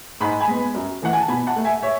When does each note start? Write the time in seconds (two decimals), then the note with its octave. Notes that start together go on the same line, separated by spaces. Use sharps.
0.21 G#2 B5
0.40 G#5 B5
0.48 G#3 B3
0.74 F#2
1.02 E3 A3 F#5
1.13 G#5
1.20 A5
1.28 B2 G#5 B5
1.47 F#5 A5
1.56 A3
1.65 E5 G#5
1.82 C#5 E5